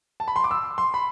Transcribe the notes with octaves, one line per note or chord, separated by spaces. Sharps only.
A5
B5
C6
D6
E6
C6
B5